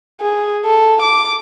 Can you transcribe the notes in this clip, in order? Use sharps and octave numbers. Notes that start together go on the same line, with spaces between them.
G#4
A4
D6